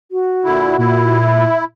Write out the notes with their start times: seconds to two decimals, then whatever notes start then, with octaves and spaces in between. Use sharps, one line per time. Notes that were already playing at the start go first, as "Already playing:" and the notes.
0.12 F#4
0.44 A#2 D3 E4
0.78 A#2 E4
1.23 E5